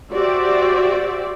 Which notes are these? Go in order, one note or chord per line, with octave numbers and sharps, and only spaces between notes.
F#4 G4 C5 D5 E5